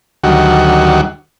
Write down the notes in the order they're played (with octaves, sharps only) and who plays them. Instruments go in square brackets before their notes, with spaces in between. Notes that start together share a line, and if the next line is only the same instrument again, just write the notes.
[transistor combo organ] D2 D#3 F#3 G3 F#4